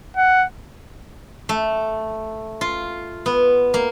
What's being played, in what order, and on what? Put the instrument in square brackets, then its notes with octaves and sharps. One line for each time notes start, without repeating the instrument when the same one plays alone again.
[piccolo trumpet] F#5
[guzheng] A3
F4
B3
A#3